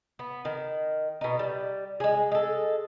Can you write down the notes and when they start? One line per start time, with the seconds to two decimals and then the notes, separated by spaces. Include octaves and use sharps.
0.19 B3
0.45 D#3
1.21 B2 D#4
1.39 G3
2.00 G#3 G#4
2.31 G#3 A4